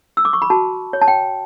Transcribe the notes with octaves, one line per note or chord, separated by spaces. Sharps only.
E6
D6
C#6
B5
F#4 A5
C#5
A5
G5